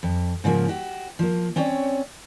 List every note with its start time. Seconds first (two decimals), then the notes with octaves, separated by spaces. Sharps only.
0.03 F2
0.44 G#2 C#3 F3 A#3
0.68 F#4 G4
1.19 F3 A#3
1.56 C4 C#4 C#5 D5